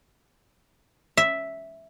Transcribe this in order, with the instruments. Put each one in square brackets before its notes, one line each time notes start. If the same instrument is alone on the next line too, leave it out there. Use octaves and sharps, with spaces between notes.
[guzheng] E5